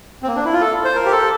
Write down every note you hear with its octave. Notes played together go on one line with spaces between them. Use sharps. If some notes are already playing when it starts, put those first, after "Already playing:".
C4
A#3
D4
E4
F4
A4
C5
A#4
G4
A4